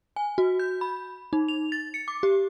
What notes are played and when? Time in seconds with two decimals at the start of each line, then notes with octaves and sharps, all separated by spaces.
0.16 G#5
0.38 F#4
0.59 G6
0.81 B5
1.33 D#4
1.48 F7
1.72 A6
1.94 C#7
2.08 D6
2.23 G4